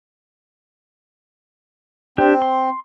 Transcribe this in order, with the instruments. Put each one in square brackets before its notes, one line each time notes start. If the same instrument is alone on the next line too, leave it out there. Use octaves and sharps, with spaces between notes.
[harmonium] C4 [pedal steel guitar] D4 G4
[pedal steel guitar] C6